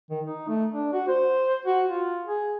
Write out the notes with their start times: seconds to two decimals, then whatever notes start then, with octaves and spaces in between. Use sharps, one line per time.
0.10 D#3
0.26 D#4
0.48 A3
0.72 D4
0.93 F#4
1.08 C5
1.65 F#4
1.88 F4
2.26 G#4